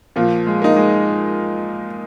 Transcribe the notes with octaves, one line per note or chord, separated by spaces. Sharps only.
A#2 F3
G#3
A#3 D#4
G#3